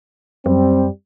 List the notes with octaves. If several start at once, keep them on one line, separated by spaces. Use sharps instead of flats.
F#2 G3 C4